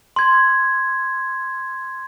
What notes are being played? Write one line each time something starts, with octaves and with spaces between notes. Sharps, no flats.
C6 G#6